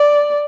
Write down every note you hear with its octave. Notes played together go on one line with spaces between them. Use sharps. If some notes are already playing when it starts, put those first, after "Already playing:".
Already playing: D5